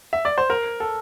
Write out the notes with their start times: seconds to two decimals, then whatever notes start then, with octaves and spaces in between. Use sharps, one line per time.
0.13 E5
0.25 D5
0.38 C5
0.50 A#4
0.80 A4